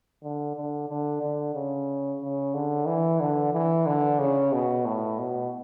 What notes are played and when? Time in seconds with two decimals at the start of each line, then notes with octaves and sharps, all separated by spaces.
0.23 D3
0.56 D3
0.89 D3
1.23 D3
1.55 C#3
2.21 C#3
2.54 D3
2.87 E3
3.20 D3
3.53 E3
3.86 D3
4.19 C#3
4.53 B2
4.85 A2
5.19 B2